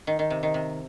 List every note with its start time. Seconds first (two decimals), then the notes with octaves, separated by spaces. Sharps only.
0.07 D#3
0.19 D#3
0.30 C3
0.43 D#3
0.54 C3